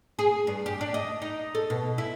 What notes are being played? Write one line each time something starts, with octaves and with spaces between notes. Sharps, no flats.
G#4
G2
G4
D4
D#5
D#4
A4
B2
E4